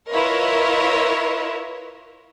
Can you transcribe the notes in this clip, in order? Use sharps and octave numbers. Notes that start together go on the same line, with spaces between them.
E4 F4 A#4 B4 C#5 D#5